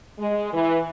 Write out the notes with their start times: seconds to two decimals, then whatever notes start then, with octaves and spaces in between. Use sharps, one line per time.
0.19 G#3
0.53 E3